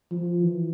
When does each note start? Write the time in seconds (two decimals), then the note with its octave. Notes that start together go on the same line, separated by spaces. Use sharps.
0.11 F3
0.43 E3